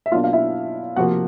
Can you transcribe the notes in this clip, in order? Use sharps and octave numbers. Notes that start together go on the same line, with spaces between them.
E5
B2 F#3 A#3 D4 F4 F5
F5
E4 E5
C3 F3 A#3 F#4 F#5